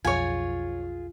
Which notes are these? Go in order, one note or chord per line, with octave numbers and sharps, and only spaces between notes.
B1 F2 F4 G#4 C#5 G#5